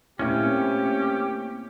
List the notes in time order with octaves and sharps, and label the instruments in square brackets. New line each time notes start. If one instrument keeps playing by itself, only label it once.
[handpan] A#2 E4 [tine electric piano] A3 A#3 C4 [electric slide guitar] C#4 [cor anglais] G4